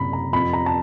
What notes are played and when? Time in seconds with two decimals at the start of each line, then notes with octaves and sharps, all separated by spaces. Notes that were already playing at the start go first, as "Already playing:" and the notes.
Already playing: F#1 C3 A#5 B5
0.13 A#5
0.33 F2 B5
0.53 A#5
0.66 A5